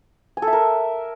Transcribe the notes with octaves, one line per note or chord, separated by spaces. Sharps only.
G#5
A4
E5
A#4